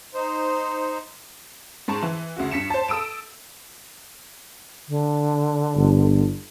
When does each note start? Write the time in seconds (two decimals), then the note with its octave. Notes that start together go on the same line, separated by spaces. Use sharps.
0.14 D#4 C5
1.88 G#2 A5 C#6
2.03 E3
2.36 D2 C#3 F#4
2.51 G2 B6 C#7 E7
2.70 C5 A5
2.88 A4 D#6 E6 D7 E7
4.89 D3
5.77 G1